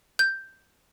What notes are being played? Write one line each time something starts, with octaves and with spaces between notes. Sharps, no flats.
G6